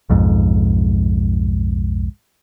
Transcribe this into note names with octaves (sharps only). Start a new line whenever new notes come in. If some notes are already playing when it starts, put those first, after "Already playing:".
B1 F2 G#2